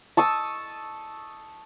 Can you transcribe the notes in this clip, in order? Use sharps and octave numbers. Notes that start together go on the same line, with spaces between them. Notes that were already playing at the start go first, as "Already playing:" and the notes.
A5 C#6 D#6 E6